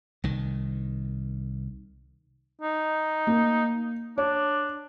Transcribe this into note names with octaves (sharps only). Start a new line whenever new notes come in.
C2 D#3
D#4
A#3
D4 C#5